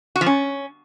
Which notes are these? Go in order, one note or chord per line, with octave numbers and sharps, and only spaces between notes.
F#4
F3
C#4